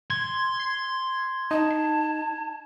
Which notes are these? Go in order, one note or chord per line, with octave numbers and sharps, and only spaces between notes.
C6 G#6
D#4 A5